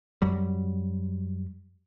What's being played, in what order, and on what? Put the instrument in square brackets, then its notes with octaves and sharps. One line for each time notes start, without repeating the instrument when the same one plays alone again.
[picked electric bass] F#2 F#3 G3